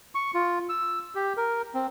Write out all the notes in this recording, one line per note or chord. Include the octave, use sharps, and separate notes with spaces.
C#6
F4
E6
G4
A#4
C4